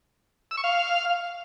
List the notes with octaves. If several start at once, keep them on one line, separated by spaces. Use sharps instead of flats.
E6
C#6
F5